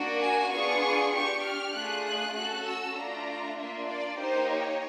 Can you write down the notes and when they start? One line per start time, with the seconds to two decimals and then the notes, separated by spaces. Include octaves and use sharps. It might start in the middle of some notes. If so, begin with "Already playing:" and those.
Already playing: A#3 D4 F#4
0.21 G#5
0.51 B3 D4 F4 G#4 C#6
1.12 D4 G4 C#6
1.44 F6
1.73 A3 D4 F4 G#4 F#6
2.05 F#6
2.34 C#4 F#4 A4 F#6
2.65 E6
2.95 A3 D4 F4 A#5
3.57 A#3 D4 F4 E5
3.87 D5
4.18 A#3 D#4 G4 C5
4.48 C#5